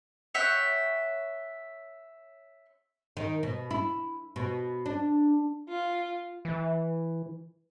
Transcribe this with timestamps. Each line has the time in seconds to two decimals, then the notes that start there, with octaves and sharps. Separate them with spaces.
0.34 C#5 E5 F#5 G5
3.17 D#3
3.43 B2
3.71 E4
4.36 B2
4.86 D4
5.68 F4
6.45 E3